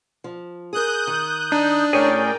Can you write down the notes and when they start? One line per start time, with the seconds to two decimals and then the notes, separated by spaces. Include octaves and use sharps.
0.24 F3
0.73 G#4 A#4 D#6 F#6 G6
1.07 D#3
1.52 D4 D#4
1.93 A2 C#4 G#4 A#4 C#5 D5 G5